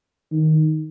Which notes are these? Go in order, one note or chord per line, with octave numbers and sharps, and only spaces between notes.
D#3